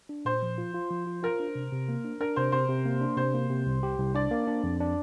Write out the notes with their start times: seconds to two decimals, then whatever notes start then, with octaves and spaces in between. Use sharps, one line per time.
0.09 D4
0.25 A#2 C5
0.42 F3
0.58 F4
0.74 F4
0.91 F3
1.07 F4
1.23 F4 A#4
1.40 D4
1.55 C3
1.72 C3
1.88 A#3
2.04 D4
2.21 D4 A#4
2.36 C3 C5
2.52 C3 C5
2.68 C3
2.85 A#3
3.01 D4
3.17 C3 C5
3.34 A#3
3.49 C3
3.66 C2
3.83 G4
3.98 C2
4.15 D4 D5
4.31 A#3
4.47 D4
4.64 F2
4.80 D4